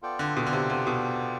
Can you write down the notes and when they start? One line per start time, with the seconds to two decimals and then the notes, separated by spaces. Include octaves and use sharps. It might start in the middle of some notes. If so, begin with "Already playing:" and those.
0.02 B3 F4 A4 D5 G5
0.19 D3
0.37 B2
0.47 D3
0.53 C3
0.70 C3
0.87 B2